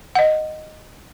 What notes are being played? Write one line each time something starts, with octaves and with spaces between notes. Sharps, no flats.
D#5 F#5